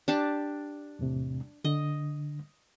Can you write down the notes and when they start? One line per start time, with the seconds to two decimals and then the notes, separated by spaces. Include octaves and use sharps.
0.08 D4 G4 A5
0.99 E2 A2 C3
1.65 D3 D#5